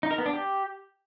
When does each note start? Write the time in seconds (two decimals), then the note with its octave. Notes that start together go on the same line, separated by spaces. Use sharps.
0.03 D#4
0.11 A#4
0.18 B3
0.26 D4
0.33 G4